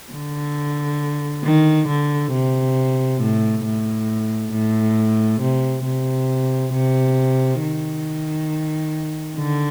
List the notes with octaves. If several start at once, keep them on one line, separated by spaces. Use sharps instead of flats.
D3
D#3
D3
C3
A2
A2
A2
C3
C3
C3
D#3
D3